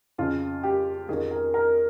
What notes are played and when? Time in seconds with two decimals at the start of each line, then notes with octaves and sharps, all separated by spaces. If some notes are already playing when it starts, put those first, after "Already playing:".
0.18 F2 C#3 F4
0.63 G4
1.09 F2 D#3 G#4
1.31 A#4
1.54 A#4